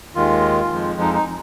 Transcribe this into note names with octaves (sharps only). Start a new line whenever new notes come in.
D#2 D#3 G#3 F4
F2 F3 G#3
D#4
D#4